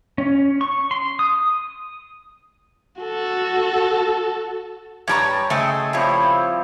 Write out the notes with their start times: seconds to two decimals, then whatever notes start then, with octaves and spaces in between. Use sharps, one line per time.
0.18 C#4
0.61 C#6
0.91 C6
1.19 D#6
3.01 F#4 A4
5.08 G2 G3 C#5 A5 A#5 C#6
5.50 C#3 A3 G#4 C5 D#5 E5 G5
5.93 F3 G3 C4 E4 C#5